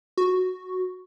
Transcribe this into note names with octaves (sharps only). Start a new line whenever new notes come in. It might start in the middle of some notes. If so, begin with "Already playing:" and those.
F#4